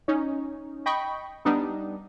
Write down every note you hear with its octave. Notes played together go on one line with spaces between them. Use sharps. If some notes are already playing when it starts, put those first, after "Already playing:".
C#4 D#4
D#5 G5 B5 C#6
G3 B3 D4 D#4